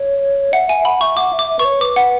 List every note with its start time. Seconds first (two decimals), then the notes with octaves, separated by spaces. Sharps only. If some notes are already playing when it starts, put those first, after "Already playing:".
Already playing: C#5
0.53 E5 F#5
0.69 E5 G#5
0.81 E5
0.85 F#5 B5
1.01 E5 C#6
1.17 F#5 D6
1.33 E5
1.39 D6
1.50 E5
1.59 B4 C#6
1.65 C#5
1.81 B4 D6
1.96 F#5